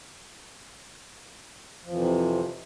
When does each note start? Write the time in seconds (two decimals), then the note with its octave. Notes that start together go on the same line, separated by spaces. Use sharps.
1.84 F3
1.88 F2
1.91 E3
1.95 C3